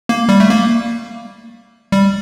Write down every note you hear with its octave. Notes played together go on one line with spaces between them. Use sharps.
A#3
G3
A3
A#3
G3